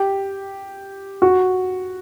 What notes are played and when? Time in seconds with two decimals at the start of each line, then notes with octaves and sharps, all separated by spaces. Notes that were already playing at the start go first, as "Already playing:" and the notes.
Already playing: G4
1.22 F#4